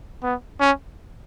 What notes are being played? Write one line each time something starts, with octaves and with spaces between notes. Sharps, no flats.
B3
C#4